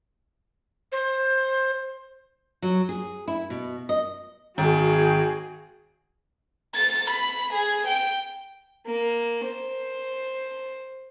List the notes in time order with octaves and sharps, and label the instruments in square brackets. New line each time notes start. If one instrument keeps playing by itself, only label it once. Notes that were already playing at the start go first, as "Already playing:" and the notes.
[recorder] C5
[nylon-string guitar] F#3
G#4
E4
B2
D#5
[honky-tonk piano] G#1 [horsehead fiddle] F#4 G#4 [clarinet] G5
[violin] A6
B5
G#4
G5
[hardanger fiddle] A#3
C5